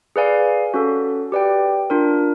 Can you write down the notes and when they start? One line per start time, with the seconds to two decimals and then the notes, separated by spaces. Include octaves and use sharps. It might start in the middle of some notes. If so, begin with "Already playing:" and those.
0.16 G#4 B4 D5 F5 G#5
0.74 C#4 F#4 A4
1.32 G4 B4 D5 G5
1.90 D4 F4 A#4